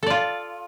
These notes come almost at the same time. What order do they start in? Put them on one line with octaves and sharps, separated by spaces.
A4 D5 F4